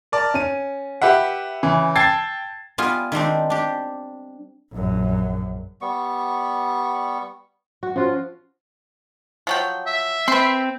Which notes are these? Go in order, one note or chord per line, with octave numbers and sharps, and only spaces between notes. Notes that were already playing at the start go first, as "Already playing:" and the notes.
A#4 D5 A5
C#4 D#7
G4 B4 E5 F#5
C#3 E3
G5 A5 E6 G#6 A6 C7
G3 B3 F4 G#5
D#3 G3 C4 D4
D4 G4
A#1 F#2
G3 B3 C#6
F#4
F3 C#4 F4 F#4
F3 F#3 G5
E5
C4 B4 C6